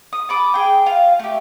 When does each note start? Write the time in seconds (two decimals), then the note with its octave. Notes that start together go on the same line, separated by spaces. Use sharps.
0.13 D#6
0.29 A5 B5 D6 D#6
0.54 G#4 G5
0.86 F4 F5
1.19 A3 G4